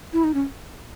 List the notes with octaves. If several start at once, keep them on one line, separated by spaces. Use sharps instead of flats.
E4
D#4
C#4